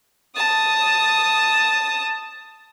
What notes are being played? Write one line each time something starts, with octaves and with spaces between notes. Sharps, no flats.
A5 D#6